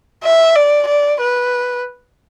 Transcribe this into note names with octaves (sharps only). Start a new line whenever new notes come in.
E5
D5
D5
B4